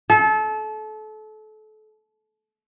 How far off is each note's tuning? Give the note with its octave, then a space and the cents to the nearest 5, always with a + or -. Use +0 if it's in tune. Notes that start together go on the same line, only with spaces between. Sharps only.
A4 -30